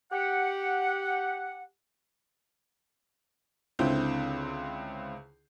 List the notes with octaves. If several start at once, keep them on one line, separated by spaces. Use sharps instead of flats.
G4 F#5
C#2 D3 C4 E4 G6